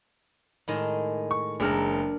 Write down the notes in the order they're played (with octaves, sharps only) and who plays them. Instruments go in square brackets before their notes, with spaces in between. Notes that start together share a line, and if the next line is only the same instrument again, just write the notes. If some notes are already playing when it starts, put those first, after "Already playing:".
[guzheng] A2 D#3 G#3
[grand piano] C#6
[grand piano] F#1 G#3 F6 [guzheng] D4 A4 A#4